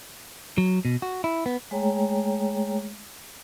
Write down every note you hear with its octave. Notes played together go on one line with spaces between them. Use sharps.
F#3
B2
F#4
E4
B3
G#3 A3 G#4 C#5 G5 A#5